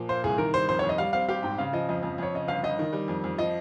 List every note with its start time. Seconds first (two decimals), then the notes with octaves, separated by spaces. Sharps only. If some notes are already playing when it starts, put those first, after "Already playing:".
Already playing: A#2 F3
0.09 A#3 C5
0.24 C2 G#4
0.38 D#3 A#4
0.54 G3 C5
0.69 F2 C5
0.79 C#5
0.83 F2
0.89 D#5
0.98 G3 F5
1.13 C4 F5
1.29 G4 F5
1.43 G#2 G5
1.58 C#3 F5
1.73 F3 D#5
1.89 F2 D#5
2.03 F2
2.18 F2 C#5
2.34 C#3 D#5
2.48 G1 F5
2.63 G1 D#5
2.79 D#3
2.93 G3
3.08 F2
3.24 F2
3.38 F3 D#5